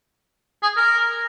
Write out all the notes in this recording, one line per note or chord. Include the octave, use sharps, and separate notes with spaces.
G#4
A#4